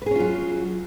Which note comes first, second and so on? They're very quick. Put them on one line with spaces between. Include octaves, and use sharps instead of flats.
B4 G#4 C#4 F4 F#3